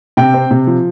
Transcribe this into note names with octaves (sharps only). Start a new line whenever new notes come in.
C3 G5
C4
C3
F3